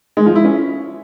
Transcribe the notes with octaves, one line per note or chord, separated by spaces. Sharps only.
G#3
F3
E4
C#4